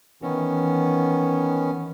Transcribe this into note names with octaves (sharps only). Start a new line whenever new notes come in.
D#3 E3 B3 C#4